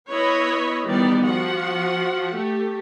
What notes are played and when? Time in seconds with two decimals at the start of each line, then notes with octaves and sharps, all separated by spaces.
0.11 B3 E4 B4 C#5 D#5 B5
0.85 D#3 E3 G3 B3 G4 D5
1.22 F3 F#4 F#5
2.34 A3 G4